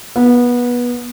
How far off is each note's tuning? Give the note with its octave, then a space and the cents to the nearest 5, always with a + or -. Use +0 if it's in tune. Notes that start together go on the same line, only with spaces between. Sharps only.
B3 -20